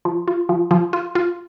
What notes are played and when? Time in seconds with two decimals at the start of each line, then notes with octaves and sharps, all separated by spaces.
0.05 F3
0.28 F4
0.49 F3
0.71 F3
0.93 F4
1.15 F4